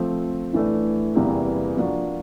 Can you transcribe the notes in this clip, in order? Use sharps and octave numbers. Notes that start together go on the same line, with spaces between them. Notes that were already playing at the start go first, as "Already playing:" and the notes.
Already playing: F3 A3 C4
A2 E3 A3 D4
E2 C3 E3 G3 A#3
F3 A#3 D4 F#4